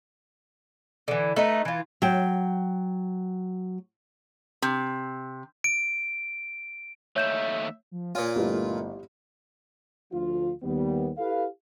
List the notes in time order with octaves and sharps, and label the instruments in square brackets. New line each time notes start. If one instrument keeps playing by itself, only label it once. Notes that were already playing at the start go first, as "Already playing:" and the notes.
[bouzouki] D3 E3
A3 D#4 B4
E3 F4
[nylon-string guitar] F#3 G5
[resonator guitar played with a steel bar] C3
[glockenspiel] D7
[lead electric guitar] D#2 A3 [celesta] C#5 G6 E7 [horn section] E5
[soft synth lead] F3
[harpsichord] A#2 F4 [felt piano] C#5 D5 F5 [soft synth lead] G#5
[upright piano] G1 B4 [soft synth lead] A3 [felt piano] E4 G4 D#5
[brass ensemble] D2 F3 F4
D#2 G3 B3
E4 G4 A4 B4 F5